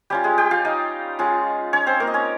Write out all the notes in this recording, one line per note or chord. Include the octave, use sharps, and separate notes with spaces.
G3 C#4 F4 G4
G#3 G#4
G4 G5
F4 F5
D#4 D#5
G#3 C#4 F4
C#4 C#5
C4 C5
A#3 A#4
D#5
C#4 C#5